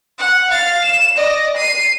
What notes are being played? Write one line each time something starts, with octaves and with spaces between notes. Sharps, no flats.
F#5
F5 A6
E7
D5 D#5
C7 D#7